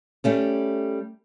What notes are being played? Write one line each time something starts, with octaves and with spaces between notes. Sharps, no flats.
G3 A3 C#4